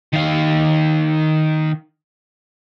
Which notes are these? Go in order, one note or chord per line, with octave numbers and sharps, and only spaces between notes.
D#3 F5